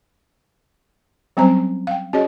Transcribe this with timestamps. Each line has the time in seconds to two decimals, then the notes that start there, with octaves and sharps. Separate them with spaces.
1.37 F#3 G3 C4 C#4 C5 A#5
1.87 F5 G5
2.13 C#4 F#4 G#4 C#5 D#5